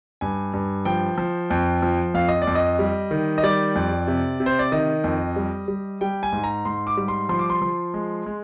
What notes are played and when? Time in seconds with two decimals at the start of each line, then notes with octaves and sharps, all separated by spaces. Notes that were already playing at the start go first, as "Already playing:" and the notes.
0.21 G2 G#5
0.54 G2
0.85 F3 G5
1.18 F3
1.50 F2
1.82 F3
2.14 F2 F5
2.29 D#5
2.42 D5
2.47 F2
2.55 D#5
2.79 G3
3.11 D#3
3.38 D#5
3.43 G3 D5
3.76 F2
4.07 C3
4.40 C3
4.46 C5
4.59 D5
4.72 D#3 D#5
5.04 F2
5.36 G3
5.68 G3
6.01 G3 G5
6.23 G#5
6.32 G#2
6.44 A#5
6.65 G#2 C6
6.87 D6
6.97 G3
7.08 C6
7.29 F3 C6
7.39 D6
7.50 C6
7.62 F3
7.94 G#3
8.26 G#3